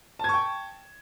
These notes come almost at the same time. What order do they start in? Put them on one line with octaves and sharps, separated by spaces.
A5 G#6 C#6 G5